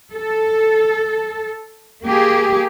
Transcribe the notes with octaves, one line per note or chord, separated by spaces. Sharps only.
A4
A#3 G4 G#4